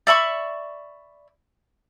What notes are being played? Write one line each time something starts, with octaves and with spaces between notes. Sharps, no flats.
D5 E5 B5 C#6